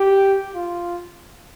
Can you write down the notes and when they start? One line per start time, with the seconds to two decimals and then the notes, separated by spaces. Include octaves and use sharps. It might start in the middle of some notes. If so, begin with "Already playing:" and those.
Already playing: G4
0.55 F4